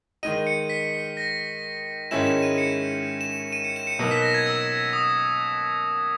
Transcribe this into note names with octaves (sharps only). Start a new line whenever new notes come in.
D#3 G#3 D#4 D#7
C#7
B6
A#6
G#2 D#3 G#3 C#4 E4 E7
E7
D#7
C#7
E7
D#7
C#7
E7
C#7
B2 F#3 A#3 D#4 C#7
B6
A#6
G#6
E6
D#6